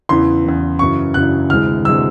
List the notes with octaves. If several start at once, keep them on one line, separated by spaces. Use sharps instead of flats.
E2 C#3 E3 C6
E2 C#3 E3
F#2 C#3 E3 C#6
F#2 C#3 E3 F#6
D2 C3 E3 G#3 F6
D2 C3 E3 G#3 E6